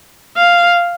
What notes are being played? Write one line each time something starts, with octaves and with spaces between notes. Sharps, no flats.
F5